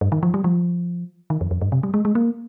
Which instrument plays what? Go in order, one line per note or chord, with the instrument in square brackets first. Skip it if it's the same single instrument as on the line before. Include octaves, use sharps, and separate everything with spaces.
[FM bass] G2
D#3
F3
G3
F3
D#3
F2
F2
G2
C3
G3
G#3
G#3
A#3